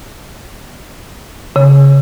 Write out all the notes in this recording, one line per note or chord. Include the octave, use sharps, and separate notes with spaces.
C#3